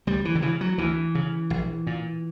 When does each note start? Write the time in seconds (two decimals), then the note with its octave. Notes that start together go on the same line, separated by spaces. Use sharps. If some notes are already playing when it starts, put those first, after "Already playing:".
0.07 D2 G3
0.25 E3
0.35 D3
0.42 C#3 E3
0.61 F#3
0.78 D2 E3
1.15 C#3
1.50 A#1
1.87 A#2